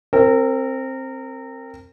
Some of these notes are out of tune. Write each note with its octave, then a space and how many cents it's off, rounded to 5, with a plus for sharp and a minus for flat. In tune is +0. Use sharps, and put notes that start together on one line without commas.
C4 +15 A#4 -25